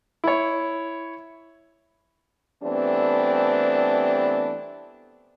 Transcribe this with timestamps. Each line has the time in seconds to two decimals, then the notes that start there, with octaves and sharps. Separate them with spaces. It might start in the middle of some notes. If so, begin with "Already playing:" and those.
0.24 E4 C#5
2.63 E3 G3 A3 B3 C4 D4